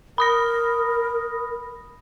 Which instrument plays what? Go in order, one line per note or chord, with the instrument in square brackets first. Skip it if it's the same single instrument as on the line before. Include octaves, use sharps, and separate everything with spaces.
[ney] A#4 [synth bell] B5 D#6 A#6